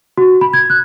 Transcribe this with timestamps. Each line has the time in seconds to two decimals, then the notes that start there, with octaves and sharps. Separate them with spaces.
0.18 F#4
0.41 B5
0.53 G#6
0.70 F#6